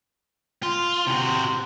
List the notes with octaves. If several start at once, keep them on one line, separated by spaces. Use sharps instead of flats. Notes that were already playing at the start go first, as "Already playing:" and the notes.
F4 C6
C3 F#4